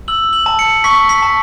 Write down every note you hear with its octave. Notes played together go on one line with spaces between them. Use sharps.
E6 F#7
F#7
A5
C#7
C#6 B6
B6
A5